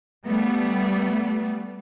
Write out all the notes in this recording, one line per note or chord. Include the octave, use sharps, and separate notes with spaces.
G3 A3 B3